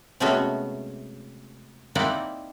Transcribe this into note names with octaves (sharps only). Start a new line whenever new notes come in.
C3 G#3 A3 B3 C#4 F#4
A#3 C4 D#4 E4 D5 F#5